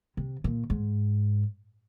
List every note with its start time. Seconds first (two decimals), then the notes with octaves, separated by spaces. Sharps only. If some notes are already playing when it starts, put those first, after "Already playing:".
0.17 C3
0.44 A#2
0.70 G#2